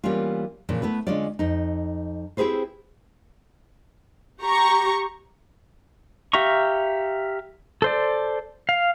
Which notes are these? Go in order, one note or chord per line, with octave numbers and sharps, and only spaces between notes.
E3 G3 A#3 B3 C#4 F4
A#2 C#3 E3 F3
A3 B3 E4 B4
D3 G#3 C#4 F4 C#5 D5
F2 D#4
C4 E4 G4 G#4 B4 C5
G4 A#5 C#6
G4 E5 F5 A#5 C#6
A4 C5 D5
F5